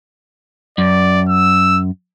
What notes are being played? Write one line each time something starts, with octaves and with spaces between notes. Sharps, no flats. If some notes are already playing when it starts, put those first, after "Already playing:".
F#2 D5
E6